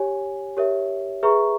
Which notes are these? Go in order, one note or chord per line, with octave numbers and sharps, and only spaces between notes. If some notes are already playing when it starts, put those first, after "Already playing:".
Already playing: G4 C#5 G#5
G4 A#4 C#5 E5
G#4 B4 E5 A#5 C#6